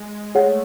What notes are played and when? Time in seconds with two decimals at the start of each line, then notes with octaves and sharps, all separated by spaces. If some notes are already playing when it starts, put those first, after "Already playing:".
Already playing: G#3
0.35 A3 G#4 C#5 F#5